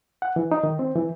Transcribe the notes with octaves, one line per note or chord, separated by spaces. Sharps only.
F#5
E3
D#4
D#3
C4
E3